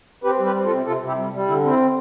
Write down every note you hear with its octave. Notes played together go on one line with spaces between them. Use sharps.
C4 G4 B4
G3
G4 B4
C4
F4 A4
C3
C3 F4 A4
C3
E4 G4
G3
G3
D3 E4
C4
E4